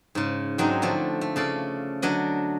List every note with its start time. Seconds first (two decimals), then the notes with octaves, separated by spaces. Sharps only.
0.15 G#2 C#3
0.58 G#2 F#3 C4 D4 D#4
0.82 D3 F3 A3 D4
1.21 A3
1.36 C#3 A4 D5 F5
2.02 D3 F#3 D4 D#5